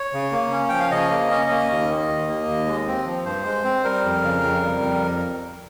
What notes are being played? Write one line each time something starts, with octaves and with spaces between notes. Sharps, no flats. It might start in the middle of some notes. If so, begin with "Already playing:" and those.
Already playing: C#5
C#3
A#3
C#4
F3 G5
F5
C#3 D#5
A#3
C#4
A#3
D#2
D#3
D#2
A#3
D#2
G#3
C4
F3
G2 C5
G#3
C4
G3 A#4
F2
C#3
F2
G3
F2